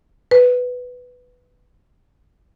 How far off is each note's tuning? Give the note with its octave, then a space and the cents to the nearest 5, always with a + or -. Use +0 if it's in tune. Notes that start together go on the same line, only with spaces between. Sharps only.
B4 +5